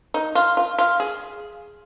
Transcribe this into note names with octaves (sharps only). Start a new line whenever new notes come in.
D#4
F4
F4
F4
G#4